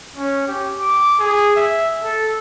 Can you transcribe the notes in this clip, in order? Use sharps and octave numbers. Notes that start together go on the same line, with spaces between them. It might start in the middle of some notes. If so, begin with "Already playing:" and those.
C#4
G4
D6
G#4
E5
A4